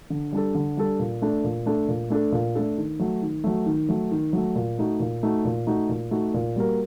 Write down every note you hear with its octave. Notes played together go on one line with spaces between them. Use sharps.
D3
G3 D4 A4
D3
G3 D4 A4
A#2
A3 D4 A4
A#2
A3 D4 A4
A#2
A3 D4 A4
A#2
A3 D4 A4
D#3
F#3 A3
D#3
F#3 A3
D#3
F#3 A3
D#3
F#3 A3
A#2
A3 D#4 F#4
A#2
A3 D#4 F#4
A#2
A3 D#4 F#4
A#2
A3 D#4 F#4
A#2
G3 A#3 F#4 A#4